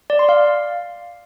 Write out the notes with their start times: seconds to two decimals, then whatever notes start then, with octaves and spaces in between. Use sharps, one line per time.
0.10 D5
0.19 C6
0.29 F5